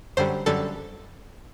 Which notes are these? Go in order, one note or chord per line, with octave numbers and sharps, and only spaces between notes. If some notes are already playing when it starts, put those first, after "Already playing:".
F#2 D3 G3 C5
F#2 D3 G3 A4